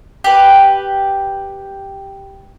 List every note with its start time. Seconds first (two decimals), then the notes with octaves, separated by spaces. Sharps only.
0.24 G4 B4